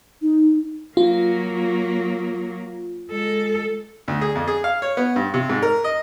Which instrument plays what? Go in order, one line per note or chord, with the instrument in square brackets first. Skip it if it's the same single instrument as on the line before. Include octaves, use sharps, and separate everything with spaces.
[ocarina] D#4
[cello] F#3 A#3 [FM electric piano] F4
[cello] G#3 A4
[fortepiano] D2
G#4
F2
G#4
F5
C#5
B3
G2
C3
G#2
A#4
D#5